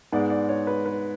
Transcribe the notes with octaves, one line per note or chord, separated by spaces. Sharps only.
G#2 G#3 B3 D5
D5
C#5
B4
B4